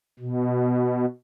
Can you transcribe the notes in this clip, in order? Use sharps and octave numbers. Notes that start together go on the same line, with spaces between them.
B2